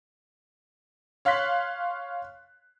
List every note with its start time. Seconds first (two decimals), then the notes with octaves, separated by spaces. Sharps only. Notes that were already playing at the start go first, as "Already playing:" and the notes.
1.25 C#5 F5 C6 F#6 B6